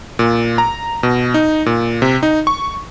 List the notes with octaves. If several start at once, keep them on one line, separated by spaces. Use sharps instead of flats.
A#2
A#5
B2
D#4
A#2
C3
D#4
C#6